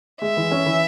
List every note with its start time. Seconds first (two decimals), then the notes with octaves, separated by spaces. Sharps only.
0.21 G#3 E5
0.37 E3
0.51 C#4
0.66 E3